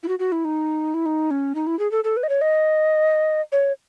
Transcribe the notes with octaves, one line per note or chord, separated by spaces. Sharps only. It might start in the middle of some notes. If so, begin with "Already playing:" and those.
E4
F#4
F#4
E4
D#4
E4
D#4
C#4
D#4
E4
G#4
A4
A4
B4
D#5
C#5
D#5
C#5